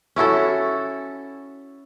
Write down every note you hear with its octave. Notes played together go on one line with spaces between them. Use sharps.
C#4 E4 F#4 A4